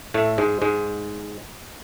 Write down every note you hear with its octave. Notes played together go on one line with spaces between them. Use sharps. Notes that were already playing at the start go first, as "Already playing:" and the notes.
A2 A3
G#2 G#3
G#2 G#3